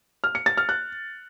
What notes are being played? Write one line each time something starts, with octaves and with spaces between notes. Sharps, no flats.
F6
C#7
A6
F6
F#6